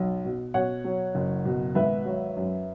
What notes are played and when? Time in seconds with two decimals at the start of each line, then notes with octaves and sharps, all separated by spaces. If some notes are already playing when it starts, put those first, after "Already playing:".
Already playing: B1
0.25 B2
0.54 B2 C#5 F#5
0.84 F#3
1.15 F#1
1.45 B2
1.75 G#1 B4 E5
2.05 F#3
2.36 F#2